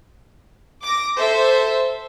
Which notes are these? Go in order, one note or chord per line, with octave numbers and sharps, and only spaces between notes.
D6 A#6
A4 C5 E5